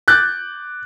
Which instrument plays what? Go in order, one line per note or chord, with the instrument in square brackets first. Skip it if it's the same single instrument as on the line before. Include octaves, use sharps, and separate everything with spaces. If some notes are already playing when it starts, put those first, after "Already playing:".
[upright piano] D6 F#6 G6 A6